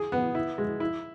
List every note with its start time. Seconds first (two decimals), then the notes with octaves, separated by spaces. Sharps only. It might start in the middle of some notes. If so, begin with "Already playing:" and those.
Already playing: G#4
0.12 B3
0.35 E4
0.58 G#3
0.80 E4